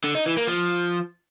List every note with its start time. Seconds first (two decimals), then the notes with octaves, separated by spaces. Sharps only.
0.04 D3
0.15 D#4
0.26 E3
0.37 A#3
0.48 F3